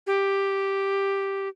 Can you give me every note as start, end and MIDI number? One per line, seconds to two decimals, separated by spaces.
0.07 1.49 67